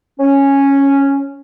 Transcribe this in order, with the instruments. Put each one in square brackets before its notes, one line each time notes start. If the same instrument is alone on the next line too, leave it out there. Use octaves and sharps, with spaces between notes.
[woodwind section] C#4